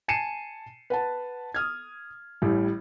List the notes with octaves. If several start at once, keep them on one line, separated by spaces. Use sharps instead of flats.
G#5 A5 C7 C#7 D#7 E7
B4 F#5 A5
D#6 F6 G#6
A1 A2 G3